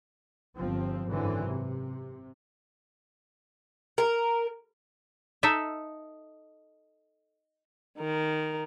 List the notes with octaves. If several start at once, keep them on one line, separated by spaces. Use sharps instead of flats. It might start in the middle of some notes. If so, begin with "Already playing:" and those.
G1 F3 C4
G#1 F#2 D3 E3 C4
C3
A#4
D#4 A4 E5
D#3 A#4